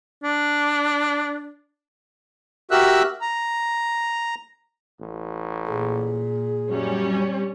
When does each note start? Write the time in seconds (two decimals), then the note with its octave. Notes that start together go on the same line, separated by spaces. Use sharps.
0.24 D4
2.71 F#4 G4 A#4 E5 E6 F#6
3.21 A#5
5.01 A1
5.69 A#2 G#4
6.71 F#2 G3 C#4